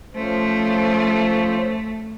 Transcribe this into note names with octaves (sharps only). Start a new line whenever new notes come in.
F3 A3 C#4 C5